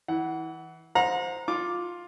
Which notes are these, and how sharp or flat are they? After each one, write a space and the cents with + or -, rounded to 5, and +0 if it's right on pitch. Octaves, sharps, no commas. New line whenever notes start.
E3 -20 F#5 +15
C5 +0 F#5 -40 A#5 +0
F4 +10 D6 +0